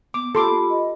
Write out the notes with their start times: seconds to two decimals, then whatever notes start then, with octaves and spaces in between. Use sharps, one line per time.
0.14 B3 D6
0.35 F4 G4 A4 B5 C6 D6
0.70 D#5